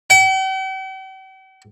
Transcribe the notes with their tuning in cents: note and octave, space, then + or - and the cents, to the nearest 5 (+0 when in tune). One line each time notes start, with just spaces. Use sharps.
G5 -45